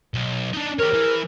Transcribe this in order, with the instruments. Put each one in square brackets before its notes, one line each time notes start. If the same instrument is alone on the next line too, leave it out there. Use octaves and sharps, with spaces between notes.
[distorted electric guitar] B1
D4 D#4
[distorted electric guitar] G4 C#5 [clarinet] A#4
[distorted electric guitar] E3